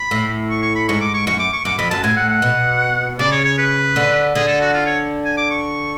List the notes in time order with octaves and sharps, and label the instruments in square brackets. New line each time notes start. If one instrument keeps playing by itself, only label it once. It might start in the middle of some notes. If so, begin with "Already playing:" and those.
Already playing: [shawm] B5
[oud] A2
[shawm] C#6
C#6
B5
[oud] G#2 [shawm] C#6
[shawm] D6
C#6
[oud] F#2 [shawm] C#6
[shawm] D6
C#6
[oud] F#2 [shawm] D6
[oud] F2 [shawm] B5
[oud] F#2 [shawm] A5
[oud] A2 [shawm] G#5
[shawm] F#5
F#5
[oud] B2
[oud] C#3 [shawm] D5
[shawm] C#5
C#5
B4
[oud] D3
[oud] D3 [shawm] G#4
[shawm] A4
F#4
F4
C#5
G#5
D6
C#6